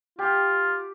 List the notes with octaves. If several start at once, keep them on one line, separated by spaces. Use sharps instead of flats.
F4 G4